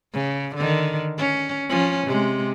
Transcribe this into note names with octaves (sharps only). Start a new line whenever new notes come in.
C#3
D3 D#3
C#4
F3 C#4
C3 G#3